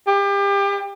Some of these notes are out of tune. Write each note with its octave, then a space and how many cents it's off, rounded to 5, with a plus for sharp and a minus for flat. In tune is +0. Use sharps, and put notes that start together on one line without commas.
G4 +30